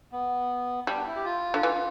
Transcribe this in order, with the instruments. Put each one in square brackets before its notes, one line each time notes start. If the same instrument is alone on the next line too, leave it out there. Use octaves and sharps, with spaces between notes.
[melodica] B3
[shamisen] G3 [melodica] D4
[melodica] E4
G4
F4
[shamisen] D3
E3